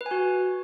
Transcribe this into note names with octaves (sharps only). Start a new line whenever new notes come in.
B4
G#5
F#4